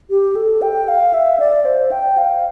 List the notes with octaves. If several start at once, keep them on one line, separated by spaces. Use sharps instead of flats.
G4
A4
G5
F5
E5
D5
C5
G5
F5